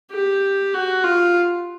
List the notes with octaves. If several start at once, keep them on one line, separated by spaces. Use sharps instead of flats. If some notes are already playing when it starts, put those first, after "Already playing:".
G4
F#4
F4